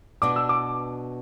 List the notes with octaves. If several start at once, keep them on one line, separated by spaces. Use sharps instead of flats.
B2 B3 D4 D6
E6
D6